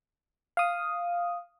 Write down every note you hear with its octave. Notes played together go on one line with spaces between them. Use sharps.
F5 D#6